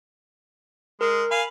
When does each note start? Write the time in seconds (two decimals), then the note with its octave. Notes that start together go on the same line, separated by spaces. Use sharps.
1.01 G#3 A#4
1.31 F5 G#5 B5